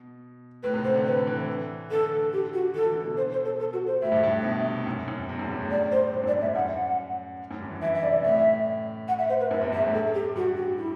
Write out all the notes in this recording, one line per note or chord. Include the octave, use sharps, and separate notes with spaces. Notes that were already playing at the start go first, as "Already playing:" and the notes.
Already playing: B2
A2 B4
C3
D3 C5
D3
B4
E3
D3 A4
G4
F#4
E3 A4
E3
D3
B2
C5
C5
A4
A4
F#4
C5
A2 E5
G2
G2
A2
B2
C3
F#2
F#2
E2
F#2
G2
A2
D5
C5
G2
F#2 D5
G2
E5
F#2
F#2 F#5
F#2
G2
E3
E3 E5
E5
C3 D5
A2 E5
F#5
E5
C5
B4
F#2 E5
E2
G2 E5
A2
A4
G4
G2 F#4
F#4
E4